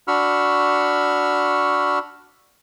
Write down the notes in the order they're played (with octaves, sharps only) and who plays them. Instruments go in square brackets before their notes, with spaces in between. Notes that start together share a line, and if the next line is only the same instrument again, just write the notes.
[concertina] D4 F#4 B5 C#6 E6 F6